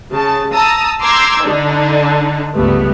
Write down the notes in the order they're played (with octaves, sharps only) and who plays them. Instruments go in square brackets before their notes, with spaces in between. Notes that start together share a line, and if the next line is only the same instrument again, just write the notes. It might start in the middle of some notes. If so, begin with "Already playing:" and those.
[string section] C#3 A5
A5 A#5 D#6 E6
A#5 C6 D6 E6 G6 G#6
D3 D4 D#4
C#2 G2 G3 A3 B3